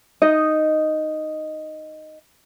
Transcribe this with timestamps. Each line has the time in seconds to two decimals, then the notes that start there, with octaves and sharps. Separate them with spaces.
0.22 D#4 D#5